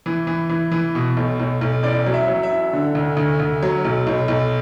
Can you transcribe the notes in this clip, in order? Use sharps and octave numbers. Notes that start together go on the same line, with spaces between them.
E3
E3
E3
E3
B2
B1
B1
B1
A1 D5
F#3
E5
F#3
E5
A1
D3
D2
D2
D2
F#3
B1
B1
B1